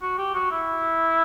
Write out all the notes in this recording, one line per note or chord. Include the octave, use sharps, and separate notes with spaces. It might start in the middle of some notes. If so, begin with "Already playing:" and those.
F#4
G4
F#4
E4